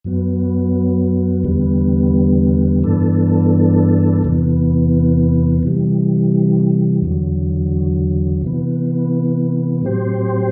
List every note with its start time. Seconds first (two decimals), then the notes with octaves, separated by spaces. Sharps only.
0.04 F#2 F#3 B3
1.43 E2 D3 G3 B3
2.83 G2 E3 B3 D4 A4
4.23 E2 C3 E3 B3
5.63 C3 E3 G3
7.02 E2 D3 F#3
8.42 C3 E3 B3
9.81 A2 F#3 C4 G4 C5